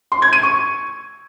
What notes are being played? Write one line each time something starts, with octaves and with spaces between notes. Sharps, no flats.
C6
G#6
D#7
C#6